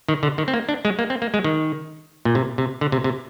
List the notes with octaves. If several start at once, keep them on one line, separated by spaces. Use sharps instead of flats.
D#3
D3
D#3
C4
A#3
D4
G#3
A#3
C4
A#3
G#3
D#3
A#2
C3
C3
D3
C3
C3